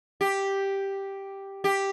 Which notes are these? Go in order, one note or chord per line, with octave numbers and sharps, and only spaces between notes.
G4
G4